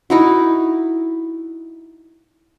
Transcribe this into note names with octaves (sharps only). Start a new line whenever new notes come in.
D#4 E4 F#4